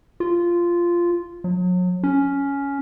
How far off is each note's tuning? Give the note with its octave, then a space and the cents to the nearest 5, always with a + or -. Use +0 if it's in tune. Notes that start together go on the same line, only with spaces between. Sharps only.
F4 -10
F#3 -35
C#4 +10